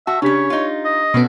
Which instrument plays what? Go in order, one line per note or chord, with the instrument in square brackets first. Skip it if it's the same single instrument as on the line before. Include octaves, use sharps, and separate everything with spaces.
[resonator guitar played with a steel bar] F#4 [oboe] E5 [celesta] A5
[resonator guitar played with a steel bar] C#3 C#4 [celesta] D4 G4 B6 [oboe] C#5
[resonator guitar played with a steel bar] D#4 F4
[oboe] D#5
[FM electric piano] B2 B3 [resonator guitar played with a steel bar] C#4 F#4 A4